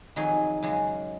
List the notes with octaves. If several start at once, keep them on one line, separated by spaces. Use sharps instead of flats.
F2 D#3 F#3 G#4
F#2 C#3 G#3